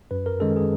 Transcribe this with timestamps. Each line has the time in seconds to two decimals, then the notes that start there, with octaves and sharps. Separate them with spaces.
0.11 F#2 B4
0.26 A#4
0.40 D#3 G#3 C#4 A4
0.56 G#4